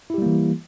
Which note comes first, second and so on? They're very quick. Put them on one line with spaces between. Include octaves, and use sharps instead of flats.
E4 G4 G3 A#3 E3